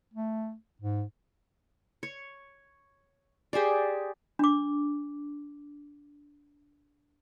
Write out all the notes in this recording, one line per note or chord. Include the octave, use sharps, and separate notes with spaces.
A3
G#2
C#5
G4 G#4 C5 D5
D4 D6